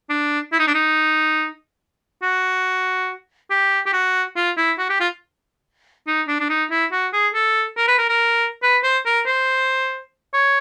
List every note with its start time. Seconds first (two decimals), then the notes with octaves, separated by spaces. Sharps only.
0.10 D4
0.52 E4
0.59 D#4
0.68 D4
0.74 D#4
2.23 F#4
3.50 G4
3.86 G4
3.93 F#4
4.36 F4
4.57 E4
4.79 F#4
4.90 G4
5.00 F4
6.07 D#4
6.28 D4
6.40 D4
6.49 D#4
6.70 E4
6.92 F#4
7.13 G#4
7.34 A4
7.77 A#4
7.88 B4
7.98 A#4
8.09 A#4
8.63 B4
8.84 C5
9.06 A#4
9.27 C5
10.34 C#5